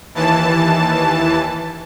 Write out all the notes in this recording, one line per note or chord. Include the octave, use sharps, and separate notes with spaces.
D#2 E3 A5